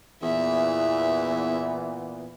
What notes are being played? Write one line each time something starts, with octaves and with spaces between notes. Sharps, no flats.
E2 A#2 E3 B3 E5